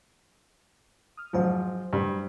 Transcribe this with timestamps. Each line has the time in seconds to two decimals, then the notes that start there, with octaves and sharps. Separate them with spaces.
1.17 D#6 F6
1.33 G#1 F3 F#3 C5
1.93 G2